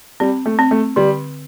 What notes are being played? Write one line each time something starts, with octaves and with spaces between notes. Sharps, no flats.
G3 C4
A3
C4
A3
D3 G3